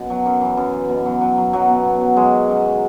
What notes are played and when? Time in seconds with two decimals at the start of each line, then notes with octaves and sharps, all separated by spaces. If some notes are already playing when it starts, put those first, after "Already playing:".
Already playing: F#2 B2
0.10 F#3
0.26 F#2
0.41 E3
0.57 F#2
0.73 E3
0.89 B2
1.06 F#3
1.21 F#3
1.38 F#3
1.53 B2 F#3
1.69 B2
1.86 B2
2.00 F#3
2.17 F#3 G#3
2.34 D#3
2.49 F#2
2.65 F#3